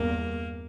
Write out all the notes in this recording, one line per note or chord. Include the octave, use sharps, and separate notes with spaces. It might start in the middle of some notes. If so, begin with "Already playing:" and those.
Already playing: E2 G2 A#3